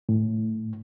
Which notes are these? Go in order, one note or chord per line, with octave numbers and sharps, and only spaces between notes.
A2